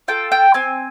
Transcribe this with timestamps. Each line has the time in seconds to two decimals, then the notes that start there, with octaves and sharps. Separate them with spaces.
0.08 F4 A4 G5
0.32 G5
0.54 C4 G#5